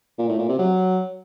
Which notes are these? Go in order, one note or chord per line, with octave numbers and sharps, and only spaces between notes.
A#2
A2
A#2
C3
F#3